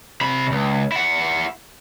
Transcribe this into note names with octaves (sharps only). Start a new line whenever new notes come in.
C3 B5
C#2
E4 F#5